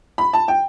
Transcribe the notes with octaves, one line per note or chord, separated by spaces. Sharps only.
B5
A5
G5